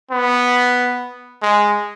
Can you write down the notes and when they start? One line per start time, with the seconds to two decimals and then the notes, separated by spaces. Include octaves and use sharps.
0.11 B3
1.42 G#3